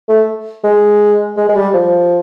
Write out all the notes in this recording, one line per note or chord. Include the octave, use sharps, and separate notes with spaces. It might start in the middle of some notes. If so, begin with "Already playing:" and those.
A3
G#3
G#3
G#3
G3
F3